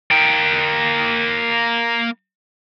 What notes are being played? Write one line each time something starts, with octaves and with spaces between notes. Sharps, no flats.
A#3 G5